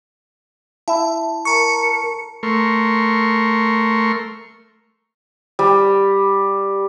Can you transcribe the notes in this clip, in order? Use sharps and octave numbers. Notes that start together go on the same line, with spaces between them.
E4 E5 A5
A#4 A5 A#5 C#6 C#7
A3 A#4 C6 C#6
G3